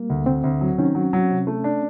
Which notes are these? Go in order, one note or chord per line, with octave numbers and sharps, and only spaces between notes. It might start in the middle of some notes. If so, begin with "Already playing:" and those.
Already playing: G3 A#3
D2
D2 C4
D2
F#3
D#3 C#4
F#3
F#3
C3
A3
D4